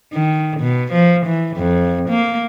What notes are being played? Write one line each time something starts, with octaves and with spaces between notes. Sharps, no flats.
D#3
B2
F3
E3
F2
A#3